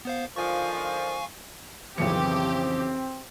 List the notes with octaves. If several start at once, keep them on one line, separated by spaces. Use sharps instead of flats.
B3 C5 F5
D3 D#3 F3 F5 G#5 C#6
B1 F2 C#3 E3 C4 G4 C#7